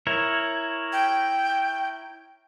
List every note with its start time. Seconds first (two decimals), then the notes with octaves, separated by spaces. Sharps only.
0.07 E4 A#4 C#5
0.93 G5